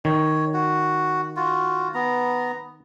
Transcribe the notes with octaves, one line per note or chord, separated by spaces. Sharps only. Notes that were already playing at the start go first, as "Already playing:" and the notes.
D#3 C#5
F#4
F4 F#4
B3 A#5